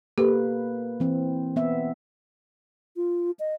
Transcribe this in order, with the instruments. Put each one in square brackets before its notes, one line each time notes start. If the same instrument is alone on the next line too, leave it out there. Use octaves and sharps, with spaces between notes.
[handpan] A#3 B4 [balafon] G4 A4
[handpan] E3 C4
B3 E5
[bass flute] F4
D#5